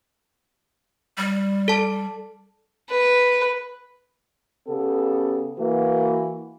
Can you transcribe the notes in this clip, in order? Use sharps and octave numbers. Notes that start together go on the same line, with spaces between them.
G3
A4 A5
B4
C#3 B3 G4 A4
E3 A#3 F#4 B4